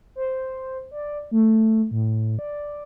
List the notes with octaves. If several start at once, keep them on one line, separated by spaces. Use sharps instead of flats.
C5
D5
A3
A2
D5